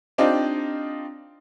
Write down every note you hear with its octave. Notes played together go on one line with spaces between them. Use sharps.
C4 D4 D#4 F4 G4